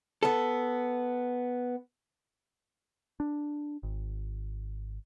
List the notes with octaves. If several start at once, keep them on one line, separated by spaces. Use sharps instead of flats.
B3 A4
D4
G#1